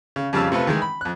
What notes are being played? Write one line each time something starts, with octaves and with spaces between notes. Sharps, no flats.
C#3
F2 C#3 G3 F5 A5 E6
C3 A3 F4 B4
D#3 E3 G#3
B5
F2 F#6